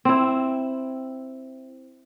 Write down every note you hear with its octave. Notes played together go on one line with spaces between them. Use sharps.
C4 E4